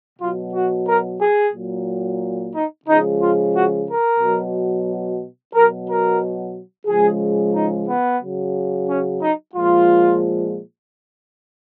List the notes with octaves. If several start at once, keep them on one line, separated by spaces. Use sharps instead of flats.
B2 F#3 F4
F#4
A#4
G#4
A#2 F#3
D#4
C#3 F3 G#3 D#4
F4
F#4
A#4
B2 F#3
B2 F#3 A#4
A#4
C#3 F3 G#3 G#4
D#4
B3
C#3 F#3
C#4
D#4
A#2 F3 G#3 F4